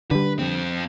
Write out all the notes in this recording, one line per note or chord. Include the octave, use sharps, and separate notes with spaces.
D3 G3 B4
F2 C4